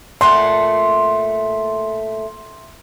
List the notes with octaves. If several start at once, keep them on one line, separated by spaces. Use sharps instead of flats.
A#2 A3 F#5 C6